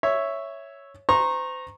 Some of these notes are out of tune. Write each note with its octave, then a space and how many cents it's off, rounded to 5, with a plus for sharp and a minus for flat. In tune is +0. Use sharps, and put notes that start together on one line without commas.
C#5 +0 E5 +0
C5 -35 A#5 +0 C#6 -30